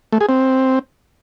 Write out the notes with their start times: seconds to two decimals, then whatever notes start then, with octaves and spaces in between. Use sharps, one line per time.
0.12 A3
0.21 G#4
0.29 C4